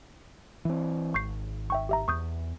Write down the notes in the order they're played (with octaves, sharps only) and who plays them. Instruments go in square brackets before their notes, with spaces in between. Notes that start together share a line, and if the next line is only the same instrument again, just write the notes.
[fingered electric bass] E3 C4
[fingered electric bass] G#1 [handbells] C#6 G6 C7
[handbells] E5 G5 C#6
G4 E5 A#5
[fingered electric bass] E2 [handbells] C#6 D#6 G6